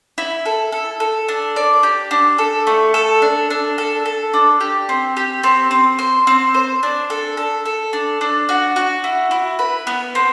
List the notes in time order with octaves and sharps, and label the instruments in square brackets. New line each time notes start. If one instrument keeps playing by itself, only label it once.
[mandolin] E4
A4
A4
A4
D4
D5
G4
D4
A4
A3
A4
D4
D4
A4
A4
D4
G4
C4
G4
C4
C4
C5
C4
C5
D4
A4
A4
A4
D4
D4
F#4
F#4
E4
E4
B4
B3
C4